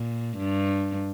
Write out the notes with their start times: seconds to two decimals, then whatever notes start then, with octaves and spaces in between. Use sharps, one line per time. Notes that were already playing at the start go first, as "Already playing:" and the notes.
Already playing: A#2
0.38 G2